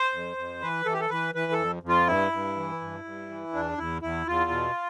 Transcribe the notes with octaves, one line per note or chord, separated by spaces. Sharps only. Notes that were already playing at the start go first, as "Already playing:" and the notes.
Already playing: C5
F2
F2
E3 B4
E3 A4
G4
A4
E3 B4
E3 B4
A4
F2
F2
F4
G2 E4
G2
E3
G2
G2
E3
E2 D4
E2 E4
E2 E4
E2 F4
B2